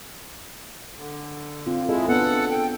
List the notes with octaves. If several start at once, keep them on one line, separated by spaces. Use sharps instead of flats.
D3
C4 F4
F2 G#3 E4 G#4 A4 D#5
B3 D4 A4 F#5
G5